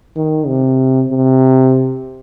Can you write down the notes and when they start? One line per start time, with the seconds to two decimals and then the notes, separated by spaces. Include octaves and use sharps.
0.16 D#3
0.47 C3
1.09 C3